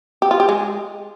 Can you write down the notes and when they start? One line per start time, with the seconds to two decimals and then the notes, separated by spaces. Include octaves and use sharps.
0.22 G4
0.31 F4
0.40 G4
0.49 G#3